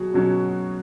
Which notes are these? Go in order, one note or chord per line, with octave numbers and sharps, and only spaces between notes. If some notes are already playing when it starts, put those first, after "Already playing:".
Already playing: B2 F#3 F#4 G#4
B2 F#3 C#4